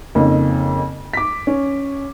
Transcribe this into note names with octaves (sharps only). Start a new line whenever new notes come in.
F2 C#3 A#3 D#4
D6 B6
C#4